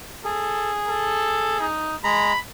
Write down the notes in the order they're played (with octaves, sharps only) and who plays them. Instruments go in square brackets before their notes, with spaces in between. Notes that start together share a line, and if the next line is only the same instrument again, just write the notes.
[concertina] G#4 [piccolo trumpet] A4
[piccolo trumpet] A4
D#4
[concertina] G#3 A#5 [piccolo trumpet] B5